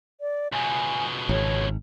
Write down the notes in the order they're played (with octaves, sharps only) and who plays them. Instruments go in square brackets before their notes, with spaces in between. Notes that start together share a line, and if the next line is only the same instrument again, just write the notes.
[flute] D5
[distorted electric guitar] C#2 B2 [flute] G#5
[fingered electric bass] G#1 [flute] C#5